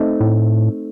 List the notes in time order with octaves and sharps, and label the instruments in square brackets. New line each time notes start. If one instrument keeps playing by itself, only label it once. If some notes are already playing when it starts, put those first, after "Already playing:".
Already playing: [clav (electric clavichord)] A3 C4 D#4
[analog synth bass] A2